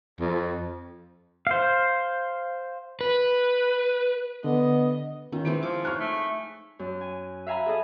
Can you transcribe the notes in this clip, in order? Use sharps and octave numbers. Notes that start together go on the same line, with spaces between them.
F2
C5 F5
B4
D3 B3 D#5
D#3 C#4 F4
E3 G#3 C4 E4 D7
F3 D6
D#4 G#4 C#5 C#6 F6 F#6
A3
F#2
G#5
E5 F5 G#5 A#5 B5
G#4 A4 D#5